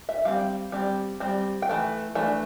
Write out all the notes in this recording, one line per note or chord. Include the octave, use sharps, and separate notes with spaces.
E5
G3 C4 F5
G3 C4
G3 C4
G5
E3 A3
E3 A3 D4